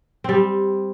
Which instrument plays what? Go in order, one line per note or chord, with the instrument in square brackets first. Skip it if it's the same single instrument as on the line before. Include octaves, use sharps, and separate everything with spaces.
[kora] G3 C4